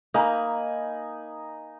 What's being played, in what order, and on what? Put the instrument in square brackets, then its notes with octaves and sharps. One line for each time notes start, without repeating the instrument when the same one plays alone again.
[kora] A#3 [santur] D#4 G#5 B5